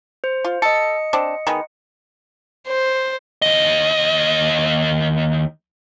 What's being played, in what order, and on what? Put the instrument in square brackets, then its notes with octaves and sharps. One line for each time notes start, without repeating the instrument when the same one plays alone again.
[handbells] C5
[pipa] F4
[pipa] A4 [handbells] D#5 C#7
[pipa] C4 D4
D#3 G#3 B3
[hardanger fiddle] C5
[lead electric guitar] D#2 D#5